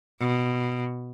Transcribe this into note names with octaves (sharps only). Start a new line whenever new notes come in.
B2